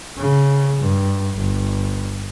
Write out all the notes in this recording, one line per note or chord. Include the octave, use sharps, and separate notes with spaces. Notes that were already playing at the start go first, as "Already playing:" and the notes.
C#3
G2
G1